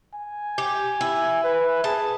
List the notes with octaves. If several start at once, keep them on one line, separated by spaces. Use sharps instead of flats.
G#5
G4
E4
B4
G#4 A5